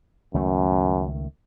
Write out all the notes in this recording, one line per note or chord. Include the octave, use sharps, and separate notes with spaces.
C#2 F#2 D#3 A3